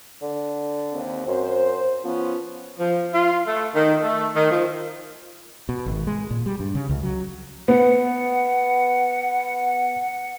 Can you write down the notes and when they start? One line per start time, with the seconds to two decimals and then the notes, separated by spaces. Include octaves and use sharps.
0.22 D3
0.92 D#2 C4
1.27 F#2 C5
2.04 F3 B3 C#4 F4
2.79 F3
3.14 F4
3.46 A3
3.75 D#3
4.03 A3
4.36 D#3
4.50 F3
5.69 B2
5.86 G#1
6.07 G#3
6.31 A#2
6.46 G3
6.60 G2
6.75 C#3
6.89 C#2
7.03 F#3
7.68 B3 F#5